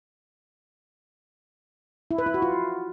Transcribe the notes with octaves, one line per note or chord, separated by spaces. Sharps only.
E4
B4
E4
F#4
F4